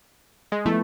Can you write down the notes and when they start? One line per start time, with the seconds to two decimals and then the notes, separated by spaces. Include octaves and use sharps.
0.52 G#3
0.65 F3 A3 B3 E4 G#4